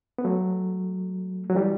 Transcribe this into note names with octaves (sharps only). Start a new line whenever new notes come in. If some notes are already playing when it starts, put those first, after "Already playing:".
B3
F#3 A3
F#3
E3 G3